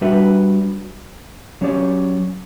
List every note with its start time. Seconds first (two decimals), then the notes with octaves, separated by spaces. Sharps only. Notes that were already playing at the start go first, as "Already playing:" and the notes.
0.01 G3 D4 F#4 B4 E5
1.61 F#3 C#4 G4 D5